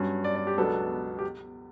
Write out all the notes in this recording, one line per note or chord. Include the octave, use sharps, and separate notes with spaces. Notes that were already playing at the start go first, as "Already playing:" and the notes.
Already playing: G2 F#3 C#4
D5
D5
G4
C#2 B2 F#3 B3 D4 A4
G4